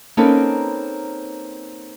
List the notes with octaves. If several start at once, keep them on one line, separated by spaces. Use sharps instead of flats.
A#3 C4 C#4 D#4 A4 B4